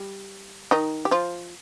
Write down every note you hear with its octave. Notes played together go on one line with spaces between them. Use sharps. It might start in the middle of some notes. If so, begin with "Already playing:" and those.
Already playing: G3
D#3 D#4
G4
F3 F4